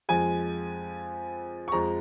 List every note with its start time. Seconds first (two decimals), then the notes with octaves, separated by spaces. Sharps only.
0.09 F2 F3 G#3 G#5
1.68 C#6
1.72 F2 F3 G#3 A#5